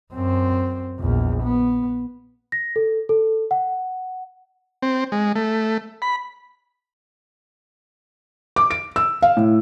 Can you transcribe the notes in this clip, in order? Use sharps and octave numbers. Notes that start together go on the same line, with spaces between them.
F#2 C4
A#1 E2
B3
A#6
A4
A4
F#5
C4
G#3
A3
B5
D6
D7
E6
F5
A2